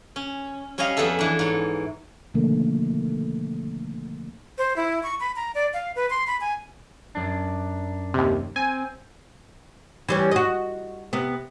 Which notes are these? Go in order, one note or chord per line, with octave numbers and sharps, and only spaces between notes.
C#4
G3 C#4 C#5 D#5 F5
F2 B3 G#4 A4 E5
E3 D4
G#2 C#5
B2 D3 D#3 F3 A3 A#3
C5
E4
C#6
B5
A#5
D5
F5
B4
C6
B5
G#5
F#2 D4
D#2 C3
C4 G#5
E3 G3 C#4
F#4 D#5
C3 B3